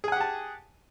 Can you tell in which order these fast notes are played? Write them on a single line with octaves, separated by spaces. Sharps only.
G#4 G#5 F#5 G4 A5